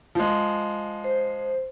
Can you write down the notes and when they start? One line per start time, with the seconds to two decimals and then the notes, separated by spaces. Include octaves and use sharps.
0.15 F3 G#3
1.04 C5